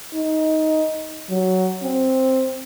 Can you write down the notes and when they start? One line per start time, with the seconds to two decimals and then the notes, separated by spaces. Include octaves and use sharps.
0.14 D#4
1.30 F#3
1.83 C4